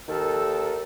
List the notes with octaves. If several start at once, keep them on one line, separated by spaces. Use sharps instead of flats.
D#2 D#3 A4